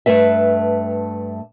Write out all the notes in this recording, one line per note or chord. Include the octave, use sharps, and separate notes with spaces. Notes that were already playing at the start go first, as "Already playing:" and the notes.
G2 A3 B4 E5